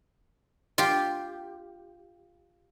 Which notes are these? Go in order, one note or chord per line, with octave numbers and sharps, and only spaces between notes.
F4 G4